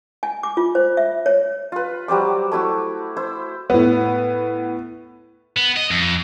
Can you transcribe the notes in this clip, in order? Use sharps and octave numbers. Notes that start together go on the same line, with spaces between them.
G#5
D6
F4
C5
E5
C#5
F4 B4
F#3 G3 C5 D6
A3 E4 F#4 D6
E4 C5
A2 B3
B3
D#5
F2